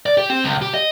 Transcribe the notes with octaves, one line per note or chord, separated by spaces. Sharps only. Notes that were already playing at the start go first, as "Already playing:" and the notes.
D5
G4
C4
C#2
G4
D#5